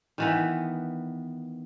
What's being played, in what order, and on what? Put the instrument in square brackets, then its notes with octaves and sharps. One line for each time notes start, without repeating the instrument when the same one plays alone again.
[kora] D#3 E3 B3